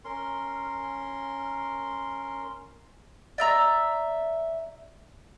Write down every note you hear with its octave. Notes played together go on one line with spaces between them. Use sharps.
C#4 A#4 C6
D5 E5 A#5 E6